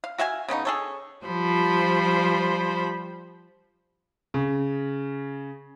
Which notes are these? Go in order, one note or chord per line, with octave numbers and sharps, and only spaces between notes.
F5
F#4 E5 F5 G#5
C#3 B3 C#4 D#4
G#4 A4 C#5
F3 G3 C5 B5
C#3